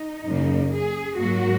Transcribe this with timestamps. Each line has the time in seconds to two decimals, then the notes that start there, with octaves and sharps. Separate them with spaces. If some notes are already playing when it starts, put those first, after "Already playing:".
Already playing: D#4
0.25 F#2 C#3 A#3
0.72 G#4
1.18 G#2 F#3 A#3 F#4